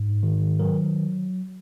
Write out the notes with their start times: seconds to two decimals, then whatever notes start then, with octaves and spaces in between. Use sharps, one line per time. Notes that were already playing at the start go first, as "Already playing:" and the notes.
Already playing: G#2
0.23 D#3
0.59 F#3 A#4